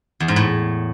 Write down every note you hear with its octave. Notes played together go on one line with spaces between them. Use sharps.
E2
G#2
A2